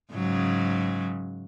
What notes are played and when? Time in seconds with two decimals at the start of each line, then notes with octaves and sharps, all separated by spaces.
0.13 G#2 C#3 F#3